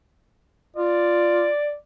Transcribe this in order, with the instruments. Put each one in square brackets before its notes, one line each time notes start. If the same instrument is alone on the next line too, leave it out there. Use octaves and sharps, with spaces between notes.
[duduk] F4 [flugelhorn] D5